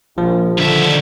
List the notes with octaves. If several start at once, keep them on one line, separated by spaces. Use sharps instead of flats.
A#1 F3
D3 D#3 E5